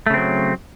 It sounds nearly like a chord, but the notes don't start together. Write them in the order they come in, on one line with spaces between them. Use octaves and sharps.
A3 C#3 C4 F#3